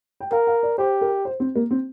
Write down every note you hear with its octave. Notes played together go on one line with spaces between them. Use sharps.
G5
A#4 F5
F5
D5
G4 C5
A#4
C5
C4
A#3
C4